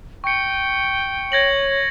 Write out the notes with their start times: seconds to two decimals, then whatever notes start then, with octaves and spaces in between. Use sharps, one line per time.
0.24 G5 C#6 C#7
1.32 C#5 G#6 A#6 F#7